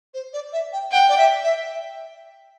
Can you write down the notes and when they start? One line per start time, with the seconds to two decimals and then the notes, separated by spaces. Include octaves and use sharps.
0.14 C5
0.33 D5
0.53 E5
0.72 G5
0.92 F#5 G5
1.09 D5
1.17 E5
1.43 E5